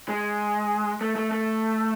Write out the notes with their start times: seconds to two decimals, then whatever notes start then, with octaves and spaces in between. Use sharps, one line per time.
0.09 G#3
1.01 A3
1.16 A3
1.32 A3